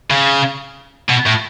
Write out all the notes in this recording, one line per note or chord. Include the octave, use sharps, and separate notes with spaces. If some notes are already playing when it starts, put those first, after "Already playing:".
C#3
B2
A2